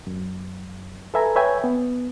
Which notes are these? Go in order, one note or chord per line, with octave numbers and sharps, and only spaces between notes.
F#2
A4 B4 E5 G#5 A#5
B4 C#5 E5 G5 G#5
B3